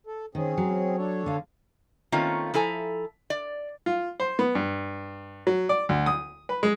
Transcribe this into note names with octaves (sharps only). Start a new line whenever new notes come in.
A4
D#3 C4 C#4 G#4
F#3
D4 A4 C#5
D3 F5
D#3 A3 A#3 C4 C#4 F4
F3 E4 A4 G#5 A#5
D5
F4
C5
B3
G2
F#3
D5
D2
D#6
B4
G#3